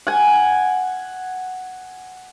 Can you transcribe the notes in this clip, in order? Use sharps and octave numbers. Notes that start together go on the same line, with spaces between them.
F#5 G#5